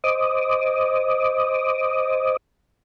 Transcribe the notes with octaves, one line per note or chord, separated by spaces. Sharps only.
C5 D#5 D6 D#6